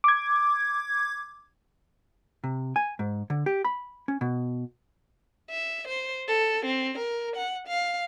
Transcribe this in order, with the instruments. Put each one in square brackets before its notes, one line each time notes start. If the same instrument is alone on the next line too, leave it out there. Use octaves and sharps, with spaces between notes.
[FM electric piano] D6 G#6
[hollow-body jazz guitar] C3
G#5
G#2
D3
G4
B5
C#4
B2
[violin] E5
C5
A4
C4
A#4
F#5
F5